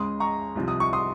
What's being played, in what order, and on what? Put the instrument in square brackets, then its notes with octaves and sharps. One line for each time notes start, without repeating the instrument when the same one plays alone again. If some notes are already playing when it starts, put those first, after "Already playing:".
Already playing: [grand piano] C#2 C#3 G#3 C6 D#6
A#5 C#6
C2 C3 F3
D#6
C#6
C6 D#6